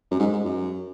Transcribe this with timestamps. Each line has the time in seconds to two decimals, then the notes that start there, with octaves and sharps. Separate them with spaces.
0.11 F#2
0.20 G#2
0.32 G#2
0.45 F#2